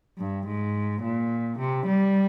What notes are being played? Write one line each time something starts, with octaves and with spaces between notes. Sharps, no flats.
G2
G#2
A#2
C3
G3